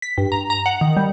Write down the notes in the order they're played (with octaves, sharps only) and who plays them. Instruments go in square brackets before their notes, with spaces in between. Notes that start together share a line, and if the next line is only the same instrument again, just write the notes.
[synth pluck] B6
G2
A#5
A#5
F#5
D#3
G3